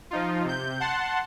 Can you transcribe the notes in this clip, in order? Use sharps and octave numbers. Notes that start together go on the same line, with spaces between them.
F3 D#4 F4
C3 G6
F#5 A5 C6